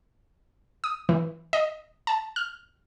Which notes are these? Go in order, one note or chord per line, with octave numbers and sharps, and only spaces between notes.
D#6
E3
D#5
A5
F6